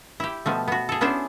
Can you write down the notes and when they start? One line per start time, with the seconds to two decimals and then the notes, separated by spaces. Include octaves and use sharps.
0.20 E4 G4
0.46 B2 F3 A3
0.68 B3 F#4
0.89 G#4 A4
1.01 B3 C#4 D4 E4 C5